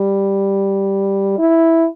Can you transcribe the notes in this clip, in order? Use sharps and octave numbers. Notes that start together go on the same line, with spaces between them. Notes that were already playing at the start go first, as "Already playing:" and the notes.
Already playing: G3
E4